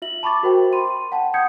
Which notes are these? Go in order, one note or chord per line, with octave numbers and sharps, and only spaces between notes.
F4 E5 F#7
A5 B5 C#6 D6 A6
F#4 A#4 C5 E5 G5
B5 C6 D#7
F#5 G5 A5
F#5 D#6 G6 G#6 C#7